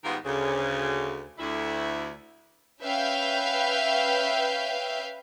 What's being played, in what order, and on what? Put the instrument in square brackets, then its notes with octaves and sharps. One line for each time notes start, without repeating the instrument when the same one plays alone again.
[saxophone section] G#2 D#3 G3 B3 F4 A#4
D2 C#3
D2 E4
[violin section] C#4 B4 E5 F5 G5 G6